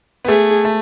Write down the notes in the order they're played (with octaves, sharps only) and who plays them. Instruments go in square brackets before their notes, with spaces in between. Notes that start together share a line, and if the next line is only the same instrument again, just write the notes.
[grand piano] B3
[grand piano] A3 [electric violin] G#4
[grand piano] A3